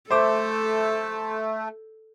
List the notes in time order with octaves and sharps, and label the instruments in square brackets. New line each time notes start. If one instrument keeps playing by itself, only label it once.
[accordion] A3 [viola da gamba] A4 [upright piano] C5 E5 D6